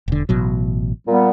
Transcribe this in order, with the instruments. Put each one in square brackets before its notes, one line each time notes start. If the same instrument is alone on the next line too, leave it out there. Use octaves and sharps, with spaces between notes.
[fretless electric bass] E1 D3
A1 B2 F#3
[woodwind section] A#2 G3 B3